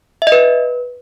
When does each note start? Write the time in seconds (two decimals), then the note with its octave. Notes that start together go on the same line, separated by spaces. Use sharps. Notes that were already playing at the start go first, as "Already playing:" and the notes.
0.22 E5
0.27 D#5
0.32 B4